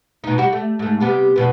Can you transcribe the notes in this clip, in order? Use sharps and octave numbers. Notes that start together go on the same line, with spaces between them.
B2 D#4
G3 F#4
A3
G#2 A3
C3 G3 B3
E2 B2 B3